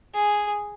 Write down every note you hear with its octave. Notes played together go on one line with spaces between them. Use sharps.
G#4